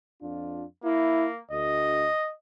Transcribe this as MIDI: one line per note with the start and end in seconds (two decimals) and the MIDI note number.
0.22 0.64 41
0.22 0.64 62
0.22 0.64 65
0.84 1.40 58
0.84 1.27 64
1.51 2.07 38
1.51 2.30 75